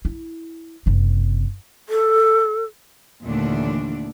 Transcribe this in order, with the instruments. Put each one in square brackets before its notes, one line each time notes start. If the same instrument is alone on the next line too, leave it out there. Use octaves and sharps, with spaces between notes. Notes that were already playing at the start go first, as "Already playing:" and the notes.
[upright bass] E4
F#1 C3
[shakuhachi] A4
[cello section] D#2 A#2 D3 E3 A3 D4